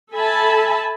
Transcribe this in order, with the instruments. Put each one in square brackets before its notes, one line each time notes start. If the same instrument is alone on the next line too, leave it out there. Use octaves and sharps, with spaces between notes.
[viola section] A4 E5 G#5 A5 B5